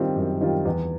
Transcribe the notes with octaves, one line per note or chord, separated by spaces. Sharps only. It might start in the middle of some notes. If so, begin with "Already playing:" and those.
Already playing: D#3 G3 C4 F4
F#2
D#3 G3 C4 F4
E2